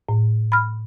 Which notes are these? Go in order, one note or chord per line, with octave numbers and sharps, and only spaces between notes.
A2
B5 F6